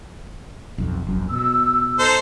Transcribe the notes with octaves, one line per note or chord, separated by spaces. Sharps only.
B1 F2
E1 A#1 F#2
B2 E6
D#4 A4 C5